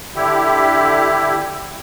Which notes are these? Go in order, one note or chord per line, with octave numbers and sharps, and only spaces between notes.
D3 E4 G4